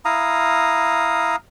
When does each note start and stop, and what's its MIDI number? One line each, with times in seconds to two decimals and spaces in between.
0.05 1.36 64
0.05 1.36 77
0.05 1.36 82
0.05 1.36 87